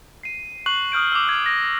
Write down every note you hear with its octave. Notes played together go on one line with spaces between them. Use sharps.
C7 D#7
C#6 F#6 C7 F#7
D#6 F6 G6 D7
D6 E6
F6 G#6
A#6